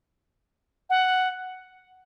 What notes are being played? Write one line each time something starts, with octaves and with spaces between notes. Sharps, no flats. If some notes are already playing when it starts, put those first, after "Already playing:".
F#5